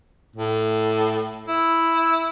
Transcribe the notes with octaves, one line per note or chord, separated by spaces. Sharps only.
A2
E4